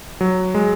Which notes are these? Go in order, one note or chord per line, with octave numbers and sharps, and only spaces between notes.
F#3
G#3